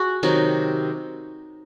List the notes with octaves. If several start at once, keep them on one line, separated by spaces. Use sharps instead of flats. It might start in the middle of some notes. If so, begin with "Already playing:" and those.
Already playing: F#4 G#4
C3 D#3 F#3 D#4